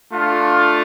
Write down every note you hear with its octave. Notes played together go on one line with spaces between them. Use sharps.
A3 D4 F4